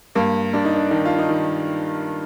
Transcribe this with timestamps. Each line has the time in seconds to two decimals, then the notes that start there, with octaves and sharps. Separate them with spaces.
0.15 G2 A#3
0.53 G2 D4
0.65 D#4
0.76 D4
0.91 D#3 D#4
1.05 F4
1.19 D#4
1.29 D#3